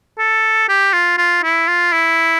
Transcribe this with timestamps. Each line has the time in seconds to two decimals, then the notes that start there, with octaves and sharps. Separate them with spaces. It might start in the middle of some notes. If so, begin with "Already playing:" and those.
0.18 A4
0.69 G4
0.93 F4
1.18 F4
1.43 E4
1.68 F4
1.92 E4